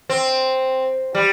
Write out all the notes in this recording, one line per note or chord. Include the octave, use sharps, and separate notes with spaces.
C4
G3